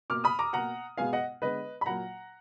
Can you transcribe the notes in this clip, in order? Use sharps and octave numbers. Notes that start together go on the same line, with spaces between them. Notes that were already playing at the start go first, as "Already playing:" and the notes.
B2 A#3 D6 F6
B5 D#6
A#5 D6
B2 A#3 F#5 A#5
B2 G#3 B3 F5 G#5
D#5 F#5
D3 G#3 B3 B4 D#5
B5
A#2 F#3 A#3 F#5 A#5